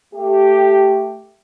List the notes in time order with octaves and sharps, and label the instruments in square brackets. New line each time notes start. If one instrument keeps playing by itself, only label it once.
[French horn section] A3 G4